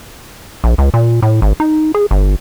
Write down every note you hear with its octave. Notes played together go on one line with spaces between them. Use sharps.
A#1
C#2
A#2
A2
G#1
D#4
G#4
G1